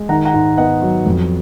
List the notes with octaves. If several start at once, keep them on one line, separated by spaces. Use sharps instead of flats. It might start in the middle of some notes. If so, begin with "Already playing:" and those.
Already playing: G#3
D#3 F#5 A#5
F#5 A#5
G#2
B3 D#5 F#5
F#3
F2